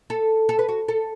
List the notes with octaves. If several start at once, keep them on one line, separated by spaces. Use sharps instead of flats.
A4
A4
B4
F#4
A4